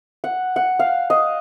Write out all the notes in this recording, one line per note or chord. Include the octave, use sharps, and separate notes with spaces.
F#5
F#5
F5
D#5